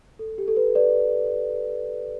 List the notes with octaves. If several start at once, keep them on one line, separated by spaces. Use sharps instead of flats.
A4
G4
A4
B4
B4 D5